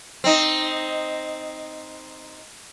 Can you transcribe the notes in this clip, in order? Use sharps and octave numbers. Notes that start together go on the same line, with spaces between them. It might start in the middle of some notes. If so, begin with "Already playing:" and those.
C4 D#4